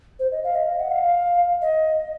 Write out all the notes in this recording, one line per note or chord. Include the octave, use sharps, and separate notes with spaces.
C5
D#5
F5
D#5
F#5
F5
D#5